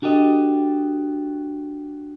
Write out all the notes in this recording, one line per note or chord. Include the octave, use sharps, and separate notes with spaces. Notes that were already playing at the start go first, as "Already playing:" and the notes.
D4 F#4 G4 A4 D#5